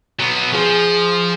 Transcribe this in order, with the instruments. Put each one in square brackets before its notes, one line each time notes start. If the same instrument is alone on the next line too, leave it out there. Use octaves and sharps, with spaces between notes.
[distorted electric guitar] F#3 B3
[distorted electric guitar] F3 [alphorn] G#4